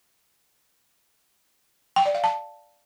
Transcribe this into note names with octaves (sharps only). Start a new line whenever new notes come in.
G5
D5
F5
A5